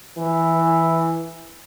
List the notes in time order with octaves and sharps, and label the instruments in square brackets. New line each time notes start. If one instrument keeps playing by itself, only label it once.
[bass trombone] E3